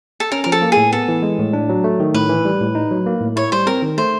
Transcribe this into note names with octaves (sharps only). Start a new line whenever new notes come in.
A4
C#4 A#4
F3 A#4
A4
A#3
G#4
A2
B3 A4
E3
G#3
A2
D4
F#3
A3
D#3
A2 B4
E3
G3
A2
D#4
F#3
A#3
A2
E4 C#5
G3 C5
C4 A#4
D#3
A3 C5